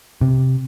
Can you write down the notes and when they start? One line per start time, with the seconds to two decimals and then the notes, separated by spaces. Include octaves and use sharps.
0.21 C3